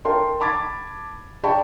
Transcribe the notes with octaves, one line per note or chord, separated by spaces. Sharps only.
A#4 G5 A5 C6
A5 B5 D6 G#6 A6
G#4 D5 G5 A5 B5 C#6